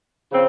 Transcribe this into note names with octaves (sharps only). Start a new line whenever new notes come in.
C#3 F3 C4